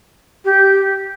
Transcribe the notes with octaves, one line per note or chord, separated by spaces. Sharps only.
G4